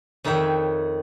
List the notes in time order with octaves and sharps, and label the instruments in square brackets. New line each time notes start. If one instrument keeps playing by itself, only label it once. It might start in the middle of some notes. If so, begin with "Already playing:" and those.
[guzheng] F2 D#3 D#4 C#5 E5 G5